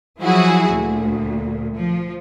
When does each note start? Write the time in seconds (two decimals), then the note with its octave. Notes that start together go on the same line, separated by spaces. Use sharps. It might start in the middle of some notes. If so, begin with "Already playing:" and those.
0.21 F3 F#3 E4 F#4 G#4
0.70 D2 A#2
1.74 F3